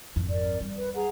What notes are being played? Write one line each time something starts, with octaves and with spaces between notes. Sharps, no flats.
G#1 F2
A#4 D5
G3
B4
G#4 F#5 A#5